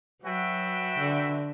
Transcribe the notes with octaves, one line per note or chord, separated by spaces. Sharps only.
F#3 F#4 B4 E5 G5
D3